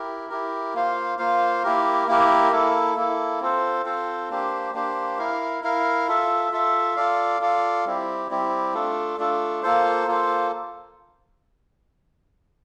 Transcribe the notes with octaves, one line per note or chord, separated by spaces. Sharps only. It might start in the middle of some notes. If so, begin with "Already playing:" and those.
Already playing: E4 G4 A#4
E4 G4 A#4
A#3 F4 C5 F5
A#3 F4 C5 F5
A#3 E4 G4 A#4
A#3 E4 G4 A#4
A#3 E4 A4
A#3 E4 A4
C4 F4 A4 C5
C4 F4 A4 C5
A#3 D4 G4 C5
A#3 D4 G4 C5
E4 A#4 F5
E4 A#4 F5
F4 A4 E5
F4 A4 E5
F4 A4 D5 F5
F4 A4 D5 F5
G3 C4 E4 G4
G3 C4 E4 G4
A3 D4 F4 A4
A3 D4 F4 A4
A#3 F4 A4 C5
A#3 F4 A4 C5